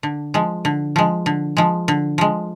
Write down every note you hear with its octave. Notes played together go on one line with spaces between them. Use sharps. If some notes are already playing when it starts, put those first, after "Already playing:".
D3
F3 G#3
D3
F3 G#3
D3
F3 G#3
D3
F3 G#3